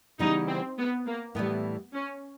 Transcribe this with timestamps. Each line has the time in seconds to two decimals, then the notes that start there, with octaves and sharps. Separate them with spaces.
0.19 C#3 E3 G3 B3 D#4
0.48 C4
0.78 B3
1.06 A#3
1.35 A2 E3 G3 B3
1.93 C#4